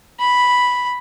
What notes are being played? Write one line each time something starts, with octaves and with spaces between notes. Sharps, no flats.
B5